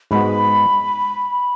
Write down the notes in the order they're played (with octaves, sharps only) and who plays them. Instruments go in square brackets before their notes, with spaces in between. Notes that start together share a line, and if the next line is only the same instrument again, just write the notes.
[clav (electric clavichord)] G#2 G#3 B3 F#4 [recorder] B5